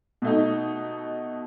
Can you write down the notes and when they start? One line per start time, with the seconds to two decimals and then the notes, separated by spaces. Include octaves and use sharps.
0.22 B2 A3 D#4